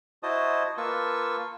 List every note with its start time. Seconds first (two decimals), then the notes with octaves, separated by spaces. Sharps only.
0.23 E4 F#4 C5 D#5 A5 D#6
0.77 A#3 F4 B4 A5 C#6 E6